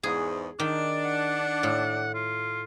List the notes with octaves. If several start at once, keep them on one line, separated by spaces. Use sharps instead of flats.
E2 G#2 G#4
D#3 D4
F#5
A2
F4